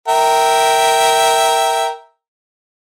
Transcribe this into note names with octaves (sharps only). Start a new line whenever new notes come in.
A#4 E5 G5